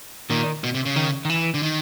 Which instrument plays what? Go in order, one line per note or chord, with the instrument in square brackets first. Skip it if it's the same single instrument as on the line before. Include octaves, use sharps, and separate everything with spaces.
[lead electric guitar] A#2 [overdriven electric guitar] D#3
[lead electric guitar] B2
C3
C#3
[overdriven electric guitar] D#3
D#3
E3
[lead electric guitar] D3
D#3